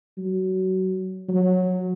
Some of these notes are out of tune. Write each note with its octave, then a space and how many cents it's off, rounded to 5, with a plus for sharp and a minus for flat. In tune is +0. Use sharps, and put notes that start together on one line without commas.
F#3 +20
F#3 -15